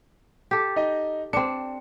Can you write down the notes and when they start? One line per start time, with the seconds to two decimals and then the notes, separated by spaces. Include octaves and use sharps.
0.51 G4 A4
0.76 D#4 D#5
1.33 C4 D4 C#7